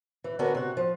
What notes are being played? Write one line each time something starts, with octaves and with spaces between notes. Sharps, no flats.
E3
D3 B3 C#4 D4 F#4 A#4
C3 F#4
F3